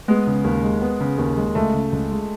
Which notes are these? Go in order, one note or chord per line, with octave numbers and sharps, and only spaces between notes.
G#3 B3
C#3
D#2
G#3
B3
C#3
D#2
G#3
C#2 A3
C#3
C#2
G#3